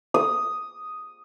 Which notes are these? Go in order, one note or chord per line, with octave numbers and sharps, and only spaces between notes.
D#6